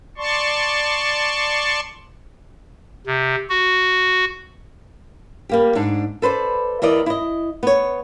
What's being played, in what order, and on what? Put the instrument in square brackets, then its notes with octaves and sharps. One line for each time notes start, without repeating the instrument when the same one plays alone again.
[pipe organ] D5 A5 C6 C#6
C3
F#4
[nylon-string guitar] G3 A#3 G4
G#2 D4
A4 B4 C5 D5
E2 E3 A#4 D5 D#5
E4 D#5
B3 C#5